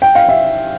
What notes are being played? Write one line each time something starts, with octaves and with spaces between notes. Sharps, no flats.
G5
F5
E5